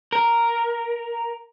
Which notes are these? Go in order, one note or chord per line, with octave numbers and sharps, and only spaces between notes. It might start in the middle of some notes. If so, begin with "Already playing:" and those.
A#4